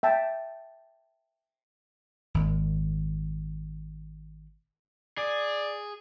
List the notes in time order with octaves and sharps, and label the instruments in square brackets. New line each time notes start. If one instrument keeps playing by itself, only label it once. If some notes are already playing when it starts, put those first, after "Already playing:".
[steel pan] E5 G5 A5
[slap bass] G#1 A#2
[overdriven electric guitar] G#4 [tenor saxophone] D5